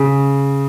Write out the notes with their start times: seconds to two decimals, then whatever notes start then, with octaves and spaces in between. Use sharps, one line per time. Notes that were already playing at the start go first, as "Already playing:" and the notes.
Already playing: C#3